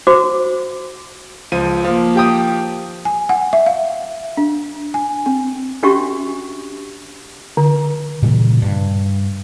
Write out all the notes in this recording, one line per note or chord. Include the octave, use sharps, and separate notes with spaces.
F#4 C5 D6
C#2 F3 D#7
F3 A#3
G4 G5 D#6
G#5
F#5
E5
F5
D4
G#5
C4
C#4 D4 F#4 G4 E5 C#6
D3
A#2 C#3 E3 G3
G2